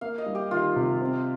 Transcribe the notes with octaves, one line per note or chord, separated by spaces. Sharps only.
A#3 F5
D#5
G3
G4
D#3 F4
C3
C4